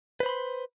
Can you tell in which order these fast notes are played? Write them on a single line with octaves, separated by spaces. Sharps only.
B4 C5 B5 C6